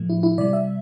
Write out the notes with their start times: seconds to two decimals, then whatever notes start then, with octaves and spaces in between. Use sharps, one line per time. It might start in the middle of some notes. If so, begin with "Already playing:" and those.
Already playing: A2 F3 A3
0.09 E4
0.23 E4
0.38 C3 G3 D5
0.53 E5